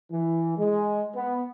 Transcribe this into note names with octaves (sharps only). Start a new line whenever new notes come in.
E3
G#3
B3